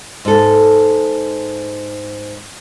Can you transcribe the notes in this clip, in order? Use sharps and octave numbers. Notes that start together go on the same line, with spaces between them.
G#2 A4